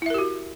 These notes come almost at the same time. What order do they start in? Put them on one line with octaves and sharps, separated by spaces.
E4 E5 A#4 G4 F#4